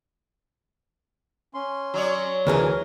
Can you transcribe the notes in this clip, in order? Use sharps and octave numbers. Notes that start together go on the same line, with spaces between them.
C#4 C6
F#3 C#5 D5
D2 E3 G#4 A#4